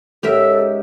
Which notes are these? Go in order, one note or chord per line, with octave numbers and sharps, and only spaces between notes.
G#2 C#3 G4 A4 A#4 E5